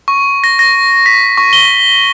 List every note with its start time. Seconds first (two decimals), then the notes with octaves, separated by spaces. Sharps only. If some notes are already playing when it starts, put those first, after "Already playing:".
0.08 C#6
0.44 A#6
0.59 A#6
1.06 B6
1.38 C#6
1.53 G7